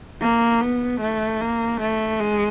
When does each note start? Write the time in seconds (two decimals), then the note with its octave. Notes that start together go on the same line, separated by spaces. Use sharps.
0.21 A#3
0.62 B3
1.01 A3
1.41 A#3
1.81 A3
2.20 G#3